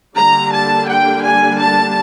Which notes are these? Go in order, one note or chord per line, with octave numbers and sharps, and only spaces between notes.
D3 G3 A#3 D4 A#5
A5
G5
G#5
A5